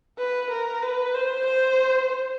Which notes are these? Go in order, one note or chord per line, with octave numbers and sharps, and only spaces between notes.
B4
A#4
B4
C5
C5